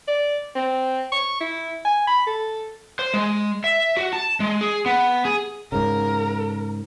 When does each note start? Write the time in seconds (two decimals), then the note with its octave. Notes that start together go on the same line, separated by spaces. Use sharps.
0.08 D5
0.56 C4
1.12 C#6
1.41 E4
1.85 G#5
2.07 B5
2.27 A4
2.99 C5
3.14 G#3
3.64 E5
3.97 F#4
4.13 A5
4.40 G#3
4.61 G#4
4.86 B3
5.25 G#4
5.72 G#2 C#3 A#4